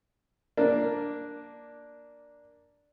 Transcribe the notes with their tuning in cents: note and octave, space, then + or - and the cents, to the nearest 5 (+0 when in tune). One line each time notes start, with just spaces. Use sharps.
A#3 +0 D4 +0